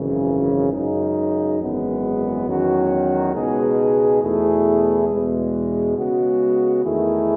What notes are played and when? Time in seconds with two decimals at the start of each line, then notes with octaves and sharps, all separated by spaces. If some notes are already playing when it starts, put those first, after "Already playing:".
Already playing: G#1 F#2 C#3 E3
0.72 F#2 C#3 G#3 D#4
1.59 G#1 F#2 E3 G#3 B3
2.47 E2 D#3 F#3 C#4 F#4
3.34 C#2 B2 G#3 D#4 G#4
4.22 E2 B2 A3 E4 G#4
5.09 E2 B2 G#3
5.96 C#3 G#3 B3 F#4
6.84 E2 D#3 A3 E4 G#4